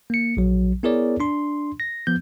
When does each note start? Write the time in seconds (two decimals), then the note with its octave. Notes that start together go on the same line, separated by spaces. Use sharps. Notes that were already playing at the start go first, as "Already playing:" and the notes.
0.10 A#3 C#7
0.37 A#1 F#3
0.83 B3 E4 G#4 A#4 C#5 D5
1.20 D4 C6
1.80 A#6
2.07 F3 B3 G6